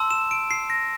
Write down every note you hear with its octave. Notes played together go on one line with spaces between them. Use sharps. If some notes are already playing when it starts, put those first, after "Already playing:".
Already playing: A5 C6 E6
E7
D7
C7
A#6